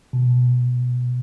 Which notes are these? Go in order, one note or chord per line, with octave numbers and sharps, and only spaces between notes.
B2